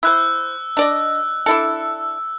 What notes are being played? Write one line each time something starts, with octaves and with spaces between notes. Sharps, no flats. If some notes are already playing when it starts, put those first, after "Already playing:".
E4 C5 E6 F#6
D4 D5 D#5
D4 E4 A4